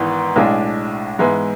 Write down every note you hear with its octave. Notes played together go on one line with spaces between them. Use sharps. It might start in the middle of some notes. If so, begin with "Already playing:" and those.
Already playing: G#1 G#2 E3 B3
B1 A2 G#3 D4
G#2 E3 G#3 B3 E4